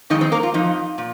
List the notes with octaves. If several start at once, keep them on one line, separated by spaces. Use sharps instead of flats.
F2 D#3 G#3 D#4 D#5
C4 C5
A#3 A#4
F4
F2 F3 D#4
A#2